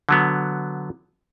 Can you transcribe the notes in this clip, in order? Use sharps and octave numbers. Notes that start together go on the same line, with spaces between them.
D3 F#3 B3